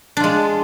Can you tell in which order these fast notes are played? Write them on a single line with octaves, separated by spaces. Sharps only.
D4 F4 G#3